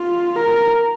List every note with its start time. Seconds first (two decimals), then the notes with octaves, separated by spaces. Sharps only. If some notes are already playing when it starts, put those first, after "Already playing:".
Already playing: F4
0.36 A#4